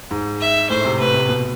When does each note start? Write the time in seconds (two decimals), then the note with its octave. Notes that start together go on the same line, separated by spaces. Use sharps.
0.11 G#2
0.40 E5
0.69 A2 C5
0.85 C3
0.99 A2 B4
1.14 C3
1.29 B2